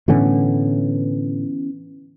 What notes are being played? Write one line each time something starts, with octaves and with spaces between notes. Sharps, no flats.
A2 D3 E3 A3 B3 C#4